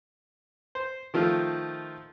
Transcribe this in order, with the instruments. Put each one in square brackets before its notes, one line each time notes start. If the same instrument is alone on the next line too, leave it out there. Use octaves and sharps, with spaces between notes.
[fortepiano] C5
D#3 F3 A3 F4 F5